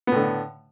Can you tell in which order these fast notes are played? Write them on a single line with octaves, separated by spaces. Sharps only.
B3 A2 D3